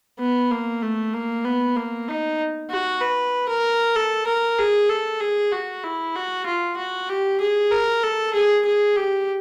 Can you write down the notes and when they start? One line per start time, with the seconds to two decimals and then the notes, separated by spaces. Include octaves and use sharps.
0.20 B3
0.51 A#3
0.82 A3
1.14 A#3
1.45 B3
1.76 A#3
2.08 D#4
2.70 F#4
3.01 B4
3.48 A#4
3.95 A4
4.27 A#4
4.58 G#4
4.89 A4
5.20 G#4
5.52 F#4
5.84 E4
6.16 F#4
6.46 F4
6.77 F#4
7.09 G4
7.41 G#4
7.72 A#4
8.03 A4
8.34 G#4
8.66 G#4
8.97 G4